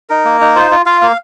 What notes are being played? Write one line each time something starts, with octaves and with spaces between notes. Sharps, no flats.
D#4 A#4
A#3
D#4
F4 C5
F4
F4 F5
A#3 F5